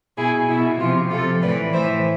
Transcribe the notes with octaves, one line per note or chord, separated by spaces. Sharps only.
B2 E4 G#4
B2 E4
C3 F3 F4
C3 F3 F4 A4
A2 E3 B4 D5
A2 E3 C5 E5